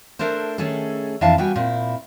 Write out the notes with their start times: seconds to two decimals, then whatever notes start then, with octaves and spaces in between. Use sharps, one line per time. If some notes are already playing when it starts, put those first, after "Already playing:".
0.19 A3 D4 A4 A#4 C5
0.58 D#3 A3 C#4 G#4 A4
1.21 F2 E3 D4 E5 F5 A5
1.38 G3 B3 F#4 G5 G#5
1.56 A#2 C4 E4